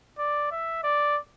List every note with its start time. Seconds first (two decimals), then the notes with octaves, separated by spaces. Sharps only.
0.18 D5
0.52 E5
0.83 D5